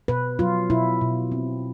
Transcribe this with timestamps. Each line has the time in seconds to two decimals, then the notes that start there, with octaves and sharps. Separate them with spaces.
0.08 B2 B4
0.39 F#3 F4
0.70 B2 E4
1.01 B2
1.32 C4